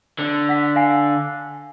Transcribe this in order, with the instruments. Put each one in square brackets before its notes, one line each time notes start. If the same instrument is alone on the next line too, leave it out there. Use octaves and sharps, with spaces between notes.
[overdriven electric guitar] D3
[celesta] F#5 B6
F5 G#5 C7